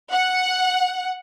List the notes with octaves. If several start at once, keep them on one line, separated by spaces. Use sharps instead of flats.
F#5